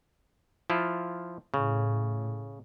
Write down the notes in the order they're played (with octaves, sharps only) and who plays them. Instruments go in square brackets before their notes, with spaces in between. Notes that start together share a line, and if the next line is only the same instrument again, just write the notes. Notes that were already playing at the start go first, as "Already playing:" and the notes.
[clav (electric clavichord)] F3 E4 F4
[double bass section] A2 [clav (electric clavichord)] C#3